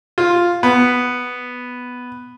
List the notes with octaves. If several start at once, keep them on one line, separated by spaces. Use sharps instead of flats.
F4
B3